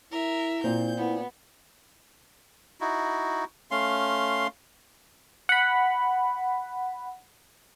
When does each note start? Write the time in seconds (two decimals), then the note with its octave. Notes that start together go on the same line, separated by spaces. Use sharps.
0.12 E4 A#4 E5
0.64 A#2 C4 G6
0.97 B3 E4
2.81 D#4 E4 F#4
3.71 A3 C#4 F5 C6
5.49 F#5 B5